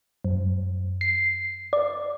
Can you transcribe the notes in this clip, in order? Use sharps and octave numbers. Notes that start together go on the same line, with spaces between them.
F#2
C7
D5